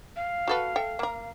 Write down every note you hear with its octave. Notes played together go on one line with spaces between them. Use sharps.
F5
F#4 A4 B4
A4 E5 G5
A#3 A#4